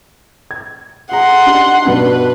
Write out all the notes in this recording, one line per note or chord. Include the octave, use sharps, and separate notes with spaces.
G#6
G#4 F#5 A#5 C6
D4 D#4 G4
G2 B2 D4 B4